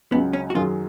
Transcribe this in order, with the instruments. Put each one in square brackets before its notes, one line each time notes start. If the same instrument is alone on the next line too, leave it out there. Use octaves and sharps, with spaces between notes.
[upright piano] C#2 C#3 F#3 [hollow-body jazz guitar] B3
[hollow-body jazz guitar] C#4
F#4
[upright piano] F#2 D#3 F#3 C#4 G#4 [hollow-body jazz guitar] F4